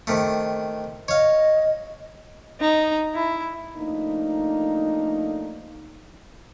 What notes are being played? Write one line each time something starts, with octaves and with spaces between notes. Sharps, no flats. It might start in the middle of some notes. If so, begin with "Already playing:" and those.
C3 D#3 A3
C#5 D#5 F5
D#4
E4
F3 A3 A#3 D4 D#4